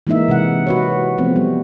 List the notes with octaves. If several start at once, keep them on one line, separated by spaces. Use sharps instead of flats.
E3 G#3 A#3 D#4 E5
C3 G#3 F#5
F#4 B4 C#5
F3 A3 B3 C4
G3